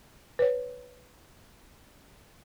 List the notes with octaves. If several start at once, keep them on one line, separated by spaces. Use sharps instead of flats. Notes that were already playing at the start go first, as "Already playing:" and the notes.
B4 C#5